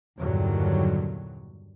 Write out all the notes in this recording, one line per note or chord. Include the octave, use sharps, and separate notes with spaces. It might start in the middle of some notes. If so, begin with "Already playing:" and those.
E2 G2 A#2 D3 D#3 F#3